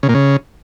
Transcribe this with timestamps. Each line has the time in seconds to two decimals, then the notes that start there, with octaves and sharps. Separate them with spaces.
0.03 C#3
0.09 A#2
0.15 C#3